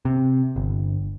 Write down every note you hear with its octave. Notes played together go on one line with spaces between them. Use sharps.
C3
G1